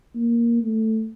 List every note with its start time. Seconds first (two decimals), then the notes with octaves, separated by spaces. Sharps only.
0.15 A#3
0.62 A3